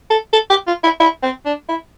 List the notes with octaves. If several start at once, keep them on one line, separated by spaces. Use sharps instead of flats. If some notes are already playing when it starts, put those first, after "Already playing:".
A4
A4
G4
F4
E4
E4
C4
D4
E4